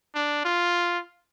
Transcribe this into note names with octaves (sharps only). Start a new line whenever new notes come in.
D4
F4